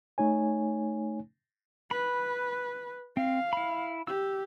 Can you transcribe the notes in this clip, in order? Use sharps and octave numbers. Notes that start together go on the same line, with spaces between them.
A3 D#4 C#5 G#5
B4 B5
C4 F5
E4 B5
G4 E6